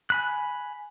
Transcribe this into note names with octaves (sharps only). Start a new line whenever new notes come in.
G#5 B5 F#6